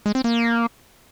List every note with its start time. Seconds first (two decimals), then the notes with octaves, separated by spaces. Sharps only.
0.06 G#3
0.15 C4
0.24 A#3